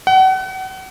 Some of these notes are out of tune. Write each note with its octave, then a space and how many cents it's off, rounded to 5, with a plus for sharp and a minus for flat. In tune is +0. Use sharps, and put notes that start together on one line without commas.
F#5 +35